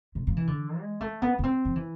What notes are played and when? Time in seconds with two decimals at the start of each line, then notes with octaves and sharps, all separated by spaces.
0.15 C3
0.27 F3
0.37 E3
0.47 D3
0.79 G#3
1.01 A3
1.22 B3
1.38 B3
1.43 C4
1.65 F3
1.76 E3